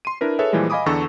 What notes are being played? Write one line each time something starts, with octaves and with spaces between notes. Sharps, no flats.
C6 D#7
D4 E4 A#4 B4
G#4 A4 B4 C#5 E5
A#2 E3 F3 G3 G#3
D#5 F5 G#5 B5 D6 D#6
E2 D3 A4 C#6 E6